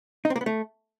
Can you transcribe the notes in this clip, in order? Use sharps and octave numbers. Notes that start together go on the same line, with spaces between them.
D#4
C4
A#3
B3
A3